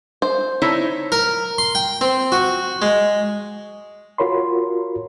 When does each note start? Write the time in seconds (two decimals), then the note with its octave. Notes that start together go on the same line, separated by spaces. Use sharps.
0.22 C5
0.62 D#4 E4 C#5
1.12 A#4
1.58 C6
1.75 G5
2.01 C4
2.32 F#4
2.82 G#3
4.18 F4 F#4 A#4 C#5 B5 C6